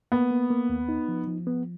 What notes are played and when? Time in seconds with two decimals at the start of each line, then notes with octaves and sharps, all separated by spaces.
0.12 A#3 B3
0.30 A#3
0.50 A#3
0.69 D#2
0.89 D#4
1.08 F3
1.27 F3
1.47 B3